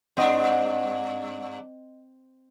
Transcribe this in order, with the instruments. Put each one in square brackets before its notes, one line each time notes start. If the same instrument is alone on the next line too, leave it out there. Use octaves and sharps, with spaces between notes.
[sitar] G2 D4 [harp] C4 D#5